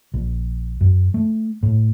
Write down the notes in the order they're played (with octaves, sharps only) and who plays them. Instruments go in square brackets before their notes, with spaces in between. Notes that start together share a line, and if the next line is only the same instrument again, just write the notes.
[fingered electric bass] A#1
F#2
A3
A2